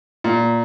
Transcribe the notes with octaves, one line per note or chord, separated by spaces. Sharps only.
A#2